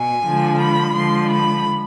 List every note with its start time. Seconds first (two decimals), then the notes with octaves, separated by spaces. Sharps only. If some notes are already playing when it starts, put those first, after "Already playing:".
Already playing: B2 G#5
0.25 D3 F3 G#3
0.60 B5
0.95 D3 F3 G#3 C6
1.30 B5